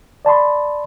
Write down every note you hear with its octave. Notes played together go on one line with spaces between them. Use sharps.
D5 A5 B5 C6